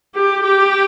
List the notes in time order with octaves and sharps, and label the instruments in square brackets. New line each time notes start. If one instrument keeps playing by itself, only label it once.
[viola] G4
G4